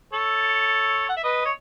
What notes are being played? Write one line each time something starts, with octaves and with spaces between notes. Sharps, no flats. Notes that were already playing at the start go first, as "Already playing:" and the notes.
A4 C#5
F#5
E5
B4 D#5
C#5